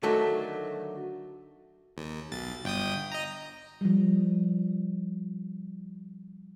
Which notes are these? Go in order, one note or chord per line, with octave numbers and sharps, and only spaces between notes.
D3 D#3 F#3 A3
D#2
B1 A6
G1 G5 D#6
D#5 A#5
F3 G3